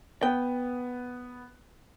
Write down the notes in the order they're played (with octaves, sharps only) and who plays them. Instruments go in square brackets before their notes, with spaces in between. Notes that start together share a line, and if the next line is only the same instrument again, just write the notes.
[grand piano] B3 [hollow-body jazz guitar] G5